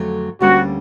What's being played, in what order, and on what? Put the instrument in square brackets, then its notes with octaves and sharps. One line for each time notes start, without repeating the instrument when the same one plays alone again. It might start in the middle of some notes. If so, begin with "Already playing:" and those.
Already playing: [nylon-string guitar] F2 D3 F#3 A3
[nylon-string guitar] D2 D3 G3 A#3 C#4 [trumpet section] F#4